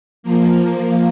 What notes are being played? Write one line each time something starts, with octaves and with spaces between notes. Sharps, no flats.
F3 A#3